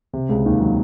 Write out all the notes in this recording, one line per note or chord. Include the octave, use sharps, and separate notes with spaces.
C3
C#2 C#3
D#2 D#3
F#3